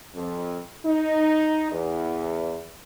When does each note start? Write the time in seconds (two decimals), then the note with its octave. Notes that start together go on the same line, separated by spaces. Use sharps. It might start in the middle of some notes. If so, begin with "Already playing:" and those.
0.15 F2
0.84 D#4
1.72 E2